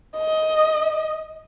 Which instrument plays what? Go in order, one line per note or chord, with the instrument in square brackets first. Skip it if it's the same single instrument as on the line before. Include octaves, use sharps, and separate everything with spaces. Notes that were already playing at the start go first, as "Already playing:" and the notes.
[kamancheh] D#5